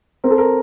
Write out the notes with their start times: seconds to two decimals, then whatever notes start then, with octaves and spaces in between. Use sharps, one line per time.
0.24 C4 A#4
0.31 A4
0.38 A#4